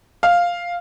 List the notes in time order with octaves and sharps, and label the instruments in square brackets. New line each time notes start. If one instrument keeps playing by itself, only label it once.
[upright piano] F5